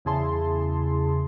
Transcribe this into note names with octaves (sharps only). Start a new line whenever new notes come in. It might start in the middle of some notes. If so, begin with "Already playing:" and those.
E2 C#3 E4 G#4 A5 C6